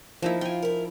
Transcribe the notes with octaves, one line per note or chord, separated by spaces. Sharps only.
F3 A#3 D#4 E4
F4 G5 G#5
E4 A#4